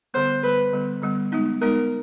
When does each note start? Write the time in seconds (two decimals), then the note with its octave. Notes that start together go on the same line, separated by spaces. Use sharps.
0.14 D3 G3 B3 C5
0.43 D3 G3 B3 B4
0.72 D3 G3 B3
1.02 D3 G3 B3
1.32 G#3 B3 D#4
1.62 G#3 B3 D#4 A#4